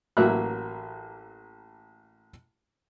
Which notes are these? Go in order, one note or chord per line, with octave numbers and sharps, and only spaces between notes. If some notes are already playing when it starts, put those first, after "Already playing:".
A1 F#3 A#3 E5 A#5 F#6